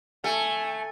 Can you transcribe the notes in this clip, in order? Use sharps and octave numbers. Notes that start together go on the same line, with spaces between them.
A3 G#5